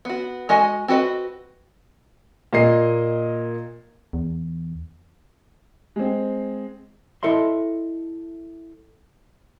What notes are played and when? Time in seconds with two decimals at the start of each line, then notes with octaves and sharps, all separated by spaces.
0.05 B3 F#4
0.49 G#3 F#4 D#5 G#5
0.88 C4 F#4 B4 D#5
2.53 A#2 A#3 D#5 C7
4.13 E2
5.96 G#3 C4
7.23 E4 A4 D#5 E5 C6